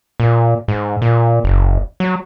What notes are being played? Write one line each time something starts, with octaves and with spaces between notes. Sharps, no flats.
A#2
G#2
A#2
F#1
F#3